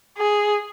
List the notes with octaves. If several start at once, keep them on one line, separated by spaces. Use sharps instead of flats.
G#4